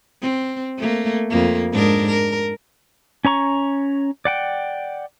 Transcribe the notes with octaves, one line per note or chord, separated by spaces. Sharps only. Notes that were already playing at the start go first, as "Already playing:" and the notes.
C4
A3 A#3
F2 A#3
G#2 D4 A#4
A#4
C#4 C#5 A#5 C#6
D5 F#5 G5